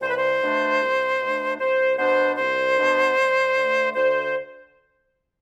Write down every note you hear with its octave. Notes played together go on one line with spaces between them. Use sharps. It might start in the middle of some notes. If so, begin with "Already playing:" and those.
C2 C5
B4
C5
B2 A3 D4
C2
B2 A3 D4
C2 C5
B2 B3 D4 C5
C2 C5
B2 B3 D4
D2
D3 A3
D2 C5